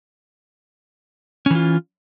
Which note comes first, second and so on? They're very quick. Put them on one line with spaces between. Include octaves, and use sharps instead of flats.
C#4 E3 F4